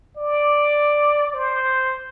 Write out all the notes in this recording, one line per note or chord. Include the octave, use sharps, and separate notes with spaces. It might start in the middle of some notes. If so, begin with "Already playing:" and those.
D5
C5